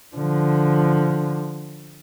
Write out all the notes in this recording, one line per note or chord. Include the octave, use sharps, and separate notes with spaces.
D3 F3